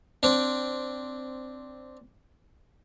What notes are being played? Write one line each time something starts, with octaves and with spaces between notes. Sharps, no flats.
C4 D4